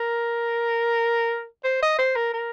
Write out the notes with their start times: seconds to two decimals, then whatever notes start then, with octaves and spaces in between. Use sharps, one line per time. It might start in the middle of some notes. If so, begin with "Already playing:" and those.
Already playing: A#4
1.64 C5
1.82 D#5
1.98 C5
2.15 A#4
2.33 A#4